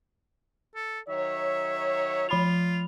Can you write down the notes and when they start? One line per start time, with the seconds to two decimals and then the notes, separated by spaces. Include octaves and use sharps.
0.75 A4
1.09 D#3 F#3 C#5 E5
2.29 F3 F4 B5 F7